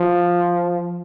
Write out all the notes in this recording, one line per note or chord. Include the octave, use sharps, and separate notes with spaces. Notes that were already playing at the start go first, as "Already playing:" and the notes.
Already playing: F3